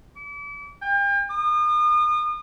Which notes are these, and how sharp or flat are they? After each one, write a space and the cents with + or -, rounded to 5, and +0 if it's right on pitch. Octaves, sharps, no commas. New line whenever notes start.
D6 -40
G5 +40
D#6 -35